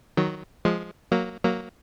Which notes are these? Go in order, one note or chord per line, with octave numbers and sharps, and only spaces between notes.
D#3 F#3
F3 G#3
F#3 A#3
F#3 A#3